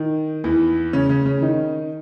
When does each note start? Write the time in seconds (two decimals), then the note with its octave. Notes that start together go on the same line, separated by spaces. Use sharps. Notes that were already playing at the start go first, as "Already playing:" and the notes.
Already playing: D#3
0.44 E2 E3
0.93 C#3 C#4
1.09 C#3 C#4
1.25 C#3 C#4
1.42 D#3 D#4